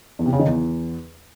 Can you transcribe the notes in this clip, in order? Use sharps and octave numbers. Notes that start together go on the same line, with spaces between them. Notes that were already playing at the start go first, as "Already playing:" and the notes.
E2
C3
C#3
D#3
E2